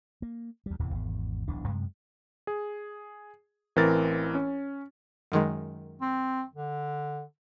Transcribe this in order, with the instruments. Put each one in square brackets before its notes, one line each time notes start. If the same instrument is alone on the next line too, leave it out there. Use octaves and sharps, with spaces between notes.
[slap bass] A#3
D2 G3
D1 E2 C3 E3
G#1 E2
D1 B1 E3 D4
F#2 C3 G#3
[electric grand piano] G#4
A1 E3 C4 A#4 A6
C#4
[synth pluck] F#2 D#3 G#3
[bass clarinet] C4
D3